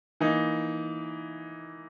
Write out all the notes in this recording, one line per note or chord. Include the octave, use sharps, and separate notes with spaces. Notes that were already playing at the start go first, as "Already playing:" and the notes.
E3 A#3 D#4